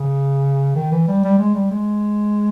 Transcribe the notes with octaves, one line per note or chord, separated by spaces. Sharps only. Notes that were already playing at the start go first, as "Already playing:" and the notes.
Already playing: C#3
D#3
E3
G3
G3
G#3
G3
G#3